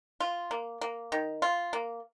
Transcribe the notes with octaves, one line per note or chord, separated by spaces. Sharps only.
F4
A#3
A#3
D#3
F4
A#3